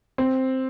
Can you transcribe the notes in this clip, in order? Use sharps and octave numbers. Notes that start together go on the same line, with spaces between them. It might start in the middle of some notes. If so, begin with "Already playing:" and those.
C4